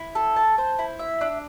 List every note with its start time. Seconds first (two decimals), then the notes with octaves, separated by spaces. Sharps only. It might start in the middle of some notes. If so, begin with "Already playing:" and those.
Already playing: E4
0.15 A4
0.36 A5
0.58 C5
0.79 E4
0.99 E5
1.21 D4